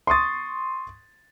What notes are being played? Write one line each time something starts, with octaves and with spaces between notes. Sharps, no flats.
C6 C#6 D#6 A6